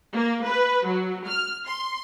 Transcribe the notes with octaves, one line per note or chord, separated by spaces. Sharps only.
A#3
B4
F#3
F6
C6